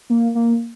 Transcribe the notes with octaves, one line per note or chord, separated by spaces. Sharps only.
A#3
A#3